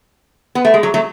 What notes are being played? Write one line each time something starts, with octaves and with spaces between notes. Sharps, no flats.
B3
A3
G#3
F#3
F#3 A3